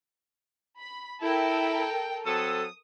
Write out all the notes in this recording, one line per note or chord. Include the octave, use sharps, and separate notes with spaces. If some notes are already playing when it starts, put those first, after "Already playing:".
B5
E4 A4 A#4 G5
F#3 C4 A4 D#6